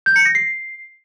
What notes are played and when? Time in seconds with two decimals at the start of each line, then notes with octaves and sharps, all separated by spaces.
0.06 G6
0.16 C#7
0.25 A#6
0.35 C7